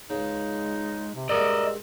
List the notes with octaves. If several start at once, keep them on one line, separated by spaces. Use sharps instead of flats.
C#2 C#3 G#3 D#4
C3
G2 A#2 G#3 A#4 D5 D#5 E6